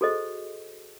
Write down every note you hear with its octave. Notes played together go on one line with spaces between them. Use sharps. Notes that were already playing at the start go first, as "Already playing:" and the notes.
F#4 G#4 A4 C5 D#5